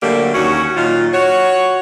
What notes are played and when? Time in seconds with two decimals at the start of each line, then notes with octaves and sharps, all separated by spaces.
0.02 D3 F#3 G3 A3 A#3
0.34 D#2 C#4 F#4
0.76 A#2 D#3 F#3 F4
1.13 F#4 C#5